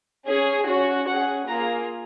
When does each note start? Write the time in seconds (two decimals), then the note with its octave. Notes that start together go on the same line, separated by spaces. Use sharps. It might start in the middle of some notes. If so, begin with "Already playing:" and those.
0.27 C#4 G#4
0.68 C#4 F#4
1.07 C#4 G#4 F#5
1.48 A#3 F4 G#4 A#5